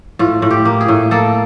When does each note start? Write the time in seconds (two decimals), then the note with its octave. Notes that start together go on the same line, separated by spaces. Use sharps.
0.19 A2 F4
0.42 A2
0.51 G4
0.65 A#3
0.81 G#4
0.88 A2
1.11 A#3 A4